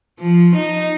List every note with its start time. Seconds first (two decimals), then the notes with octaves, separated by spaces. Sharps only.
0.19 F3
0.56 D#4